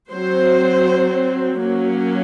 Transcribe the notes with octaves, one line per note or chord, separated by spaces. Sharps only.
F#3 C4 C5
F#3 A#3 C#4